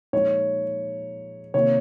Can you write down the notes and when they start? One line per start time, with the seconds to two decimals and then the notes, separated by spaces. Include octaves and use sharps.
0.13 A#2 F3 G#3 D#4 C#5
1.54 C3 D#3 A#3 F4 C#5